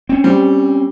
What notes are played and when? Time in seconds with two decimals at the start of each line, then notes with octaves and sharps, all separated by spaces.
0.09 C4 C#4
0.24 G3 C5